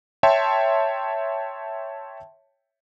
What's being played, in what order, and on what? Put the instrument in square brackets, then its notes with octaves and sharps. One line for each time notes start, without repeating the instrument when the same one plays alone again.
[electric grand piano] C#5 E5 G5 A5 C6